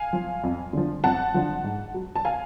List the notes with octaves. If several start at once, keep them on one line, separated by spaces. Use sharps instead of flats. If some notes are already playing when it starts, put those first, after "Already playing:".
Already playing: F5 G#5
F3
F2
D3 F3
F2 F#5 A5
D3 F3
G#2
F#3
A5
F5 G#5